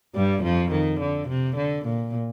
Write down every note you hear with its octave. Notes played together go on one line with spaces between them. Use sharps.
G2 G3
F2 F3
D#3
D3
C3
D3
A#2